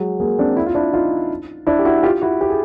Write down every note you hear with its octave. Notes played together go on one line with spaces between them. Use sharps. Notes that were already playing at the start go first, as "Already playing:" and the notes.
Already playing: F#3 G#3
G#3 A#3
C4 D4
D4 E4
F4
D4 E4
D#4 F4
D4 E4
G4
E4 F#4
F4 G4
E4 F#4
G4
G#4